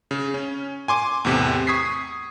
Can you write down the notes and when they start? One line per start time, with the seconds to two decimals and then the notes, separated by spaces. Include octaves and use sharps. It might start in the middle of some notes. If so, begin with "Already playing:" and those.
0.11 C#3
0.34 C#4
0.88 G#5 C6 D6
1.25 E2 A2 C3
1.67 C#6 D#6 G#6 B6 C7